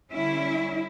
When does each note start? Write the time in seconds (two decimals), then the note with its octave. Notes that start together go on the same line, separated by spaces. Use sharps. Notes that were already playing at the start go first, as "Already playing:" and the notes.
0.10 D3 G3 C#4 E4